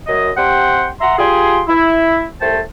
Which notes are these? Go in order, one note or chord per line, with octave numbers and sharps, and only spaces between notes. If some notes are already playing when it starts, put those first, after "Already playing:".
F#2 D#5
C3 G4 F#5 G5 C6
E5 F#5 A#5 C6
F4 G4 G#4 G#5 C6
E4
C2 A3 C5 G5 A5